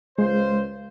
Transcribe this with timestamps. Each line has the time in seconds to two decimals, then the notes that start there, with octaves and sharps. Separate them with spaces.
0.19 C#2 G#3 F4 C5